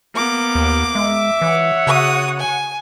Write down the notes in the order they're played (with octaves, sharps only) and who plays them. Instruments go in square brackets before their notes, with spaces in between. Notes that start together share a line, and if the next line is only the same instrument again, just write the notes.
[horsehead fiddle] A#3 B3 [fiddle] D6
[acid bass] D#2
[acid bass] G#3 [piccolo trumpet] E5
[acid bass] E3 [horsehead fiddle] C#5 F#5
[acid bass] C#3 [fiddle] F#4 D#6
[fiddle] G#5